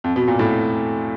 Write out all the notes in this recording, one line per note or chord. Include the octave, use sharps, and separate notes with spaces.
F2
B2
A#2
A2